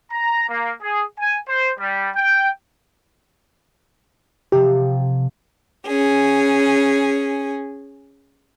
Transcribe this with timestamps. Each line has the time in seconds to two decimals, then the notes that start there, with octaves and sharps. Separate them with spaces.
0.11 A#5
0.49 A#3
0.83 G#4
1.18 G#5
1.48 C5
1.79 G3
2.16 G5
4.52 C3 F3 G4
5.88 C#4 G#4